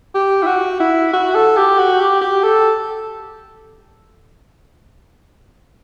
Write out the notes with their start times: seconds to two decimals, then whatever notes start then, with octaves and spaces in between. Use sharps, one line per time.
0.14 G4
0.42 E4
0.47 F#4
0.80 E4
1.13 F#4
1.35 A4
1.57 G4
1.78 F#4
2.00 G4
2.21 G4
2.43 A4